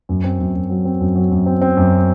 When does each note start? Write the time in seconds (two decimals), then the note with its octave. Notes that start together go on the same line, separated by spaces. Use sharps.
0.09 F#2
0.24 C4
0.40 F#2
0.55 F#2
0.70 F#3
0.85 C4
1.01 F#2
1.16 F#3
1.31 F#2
1.46 C4
1.61 C4
1.77 F#2